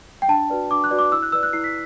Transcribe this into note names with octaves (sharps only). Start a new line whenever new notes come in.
G5
D4 A5
F#4 B4 D5
D4 D6
F#6
F#4 B4 D5
D6
E4 E6
F#6
B4 D5 E6
F#6
E4 C7
B6